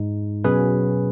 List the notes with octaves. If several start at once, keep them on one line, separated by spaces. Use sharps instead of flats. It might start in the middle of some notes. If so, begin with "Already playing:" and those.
Already playing: G#2 G#3 D#4
B2 F#3 C#4 G#4 B4